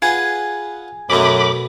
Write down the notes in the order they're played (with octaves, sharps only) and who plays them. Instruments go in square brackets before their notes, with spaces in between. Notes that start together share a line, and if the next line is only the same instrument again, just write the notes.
[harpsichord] F4 B4 F#5 [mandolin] G#4
[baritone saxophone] F#2 [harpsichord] B2 A3 [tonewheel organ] B5 D6